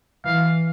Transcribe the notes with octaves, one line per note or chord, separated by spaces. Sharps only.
E3 F5